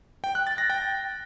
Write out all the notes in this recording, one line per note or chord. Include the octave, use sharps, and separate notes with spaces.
G5
F#6
A6
A#6
G5